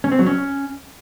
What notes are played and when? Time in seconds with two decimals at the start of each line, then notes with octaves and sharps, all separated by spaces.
0.04 C#4
0.12 C4
0.19 F#3
0.26 C#4